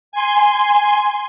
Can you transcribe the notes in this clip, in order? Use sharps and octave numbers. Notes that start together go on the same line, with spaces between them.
G#5 C6